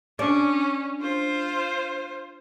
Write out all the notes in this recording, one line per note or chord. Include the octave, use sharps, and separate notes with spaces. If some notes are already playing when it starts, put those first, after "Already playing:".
C#4 D4
F4 C5